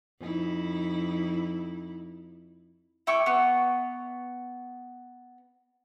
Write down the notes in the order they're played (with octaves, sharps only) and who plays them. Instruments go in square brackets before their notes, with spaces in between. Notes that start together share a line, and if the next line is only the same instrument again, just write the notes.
[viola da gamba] F2 D#4 E4
[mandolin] E4 G5 C#6 D6
B3 C#6